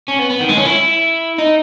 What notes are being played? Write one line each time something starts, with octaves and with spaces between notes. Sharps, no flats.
C#4
B3
B3
D#3
G#3
C#4
E4
D#4